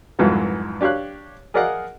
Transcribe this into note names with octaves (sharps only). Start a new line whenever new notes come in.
C2 F2 G#2 E3 F#3 B3
D4 G4 C#5 F5 F#6
G#4 A#4 D5 D#5 F5 F#5